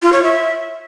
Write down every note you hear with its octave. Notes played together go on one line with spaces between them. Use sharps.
F4
C#5
E5